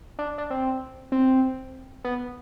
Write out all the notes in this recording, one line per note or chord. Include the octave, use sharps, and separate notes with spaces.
D4
D4
C4
C4
B3